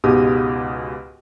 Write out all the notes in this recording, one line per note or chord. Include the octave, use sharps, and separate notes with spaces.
C#2 G#2 B2 G4 D#6